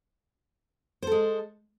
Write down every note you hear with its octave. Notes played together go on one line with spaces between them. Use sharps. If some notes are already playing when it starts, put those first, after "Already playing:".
G#3 A4 C5